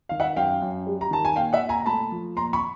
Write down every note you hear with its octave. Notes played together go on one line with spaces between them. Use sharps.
D#3 F5
E5 F#5
F#2 F5 G5
F#2
G3
A#5
D#3 A5
G#5
A#2 F5 G5
E5 F#5
A#2
G#5 A#5
A#5
A3 A5 B5
F3
A#2 A#5 C6
B5 C#6